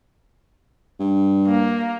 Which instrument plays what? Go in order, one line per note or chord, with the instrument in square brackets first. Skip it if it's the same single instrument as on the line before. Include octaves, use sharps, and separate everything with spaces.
[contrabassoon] G2
[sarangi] A#3